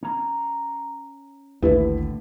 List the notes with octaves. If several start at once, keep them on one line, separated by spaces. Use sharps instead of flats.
C#4 A#5
A1 D#2 A2 D3 E4 B4